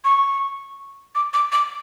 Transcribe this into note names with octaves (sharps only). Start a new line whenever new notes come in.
C#6
D6
D6
D6